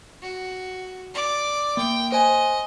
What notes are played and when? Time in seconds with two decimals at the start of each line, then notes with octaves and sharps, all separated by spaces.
0.22 F#4
1.14 D5 D6
1.77 A#3 G5
2.12 C5 D#5 G#5